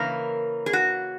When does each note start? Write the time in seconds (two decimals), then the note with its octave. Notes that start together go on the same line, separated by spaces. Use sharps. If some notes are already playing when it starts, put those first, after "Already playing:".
Already playing: C#3 E3 A#3 A#4
0.66 G#4
0.73 F#4